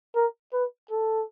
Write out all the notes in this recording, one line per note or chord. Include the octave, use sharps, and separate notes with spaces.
A#4
B4
A4